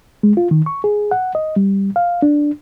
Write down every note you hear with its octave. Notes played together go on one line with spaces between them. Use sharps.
G#3
F4
D#3
C#6
G#4
F#5
D#5
G3
F5
D4